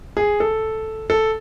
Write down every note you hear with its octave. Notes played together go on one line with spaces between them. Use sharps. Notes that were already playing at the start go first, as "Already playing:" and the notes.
G#4
A4
A4